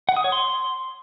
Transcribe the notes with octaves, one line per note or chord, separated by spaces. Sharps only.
F#5
D#6
C#5
C6